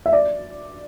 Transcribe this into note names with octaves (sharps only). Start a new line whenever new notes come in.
E5
D5